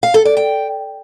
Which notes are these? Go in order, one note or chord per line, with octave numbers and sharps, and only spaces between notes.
F5
A4
D5
G5